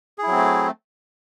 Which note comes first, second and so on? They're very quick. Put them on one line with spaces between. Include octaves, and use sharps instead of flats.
G#4 E4 F#3 C4 A3